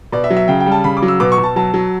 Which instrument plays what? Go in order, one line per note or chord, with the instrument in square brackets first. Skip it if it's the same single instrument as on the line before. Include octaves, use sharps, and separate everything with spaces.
[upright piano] B2 D5
E5
F#3
E5
C#3 G5
G5
G3
A5
C#3 B5
D6
F#3
E6
B2 D6
C#6
B2
A5
F#3 A5
F#3